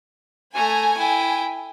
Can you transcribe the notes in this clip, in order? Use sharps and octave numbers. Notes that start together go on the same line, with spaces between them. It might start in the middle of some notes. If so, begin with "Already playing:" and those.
A3 G#5 A#5
E4 G5